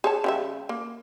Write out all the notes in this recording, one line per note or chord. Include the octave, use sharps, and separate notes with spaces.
G#4 C#5 A5
C#3 G3 E5
A#3